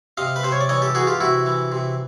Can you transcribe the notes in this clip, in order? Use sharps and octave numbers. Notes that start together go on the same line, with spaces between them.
C3 D#5 F5
B4
C3 C5
C#5
D5
E3 C#5 D#5
G4 A4
E3 F#4 G#4
F4 G4
C3 E4 F#4
E3
C3